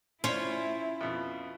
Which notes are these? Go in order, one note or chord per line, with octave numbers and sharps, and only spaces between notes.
C#4 E4 F4 C5
F2 B2